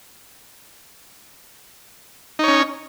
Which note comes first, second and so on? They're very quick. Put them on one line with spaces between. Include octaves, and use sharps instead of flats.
D#4 C#5 C#4